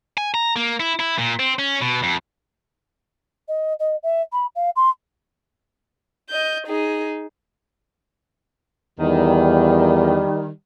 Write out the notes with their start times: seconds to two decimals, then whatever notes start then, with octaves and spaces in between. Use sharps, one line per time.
0.18 G#5
0.34 A#5
0.56 A#3
0.80 E4
1.00 E4
1.18 A#2
1.39 C4
1.59 C#4
1.81 B2
2.03 F2
3.48 D#5
3.79 D#5
4.03 E5
4.32 B5
4.55 F5
4.76 C6
6.30 D#5 G6
6.67 D#4 G#4
9.00 E2 D#3 G3